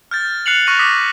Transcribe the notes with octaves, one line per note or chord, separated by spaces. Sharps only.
F6 G6 A6
F#6 C7 C#7 F7 F#7
C#6 F6 F#6 A#6 D#7 F7
D6 D#6 A#6 B6